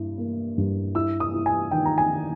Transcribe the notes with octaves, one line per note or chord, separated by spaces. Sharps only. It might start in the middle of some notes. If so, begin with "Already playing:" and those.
Already playing: G2 E4
A#3
G2
E4 E6
D#6
E4
G#5
D#3 G5
A#5
G#5
D#3